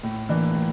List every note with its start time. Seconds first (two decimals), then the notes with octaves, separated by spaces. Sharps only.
0.03 A2
0.29 E3 A#3 D4
0.55 A2